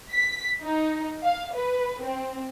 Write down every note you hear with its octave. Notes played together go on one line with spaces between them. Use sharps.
B6
D#4
F5
B4
C4